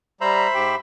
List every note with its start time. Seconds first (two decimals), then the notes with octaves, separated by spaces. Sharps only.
0.21 G3 C5 E5 A#5 B5
0.54 G#2 G4 G5